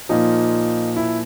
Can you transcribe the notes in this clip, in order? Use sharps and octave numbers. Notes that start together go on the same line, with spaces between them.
A#2 F3 D#4
E4